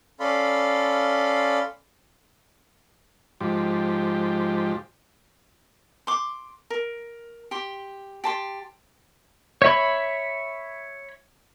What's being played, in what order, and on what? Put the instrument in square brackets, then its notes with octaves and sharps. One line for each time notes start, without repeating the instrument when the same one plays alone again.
[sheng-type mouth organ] C#4 A4 D5 F5 B5 C6
[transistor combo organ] G#2 F3 G4
[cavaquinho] C6 D6
A#4
G4 C6
G4 A5 C6
[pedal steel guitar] C#5 E5 B5